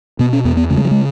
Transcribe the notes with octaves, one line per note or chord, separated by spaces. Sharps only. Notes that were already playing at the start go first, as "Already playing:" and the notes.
B2 B3
C#4
E2 B3
B3
C#3 A3
G#3
F#3
G#3